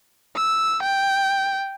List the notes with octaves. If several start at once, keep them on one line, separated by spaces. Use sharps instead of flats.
E6
G5